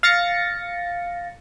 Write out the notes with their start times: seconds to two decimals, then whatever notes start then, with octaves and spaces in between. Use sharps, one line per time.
0.03 F5 A6 A#6 C#7